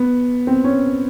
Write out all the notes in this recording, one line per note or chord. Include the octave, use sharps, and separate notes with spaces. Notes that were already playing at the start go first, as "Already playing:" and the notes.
Already playing: B3
C4
C#4